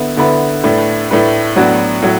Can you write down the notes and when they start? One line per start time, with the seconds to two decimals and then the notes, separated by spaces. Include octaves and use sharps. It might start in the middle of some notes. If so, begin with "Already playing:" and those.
Already playing: D3 B3 E4 B4
0.17 D3 B3 E4 B4
0.64 A2 A3 D4 B4
1.11 A2 A3 D4 B4
1.56 A2 F#3 B3 D4 F#4
2.02 A2 F#3